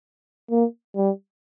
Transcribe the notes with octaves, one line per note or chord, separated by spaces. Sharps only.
A#3
G3